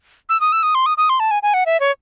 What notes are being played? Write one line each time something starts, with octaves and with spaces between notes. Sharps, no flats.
E6
D#6
E6
D#6
C6
D#6
D#6
C6
A5
G#5
G#5
F#5
E5
C#5